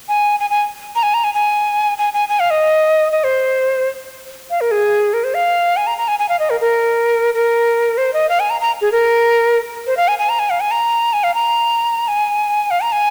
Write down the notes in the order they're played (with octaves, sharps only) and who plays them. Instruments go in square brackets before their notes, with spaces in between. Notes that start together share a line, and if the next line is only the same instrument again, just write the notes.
[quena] G#5
G#5
G#5
A#5
G#5
A#5
G#5
G#5
G#5
G#5
G#5
F5
D#5
D#5
C5
F5
A#4
G#4
A#4
C5
F5
G#5
A#5
A#5
G#5
G#5
F5
D#5
A#4
A#4
A#4
C5
D#5
F5
G#5
A#5
A#5
G#4
A#4
C5
F5
G#5
G#5
A#5
G#5
F5
G#5
A#5
G#5
F5
A#5
G#5
F5
A#5
G#5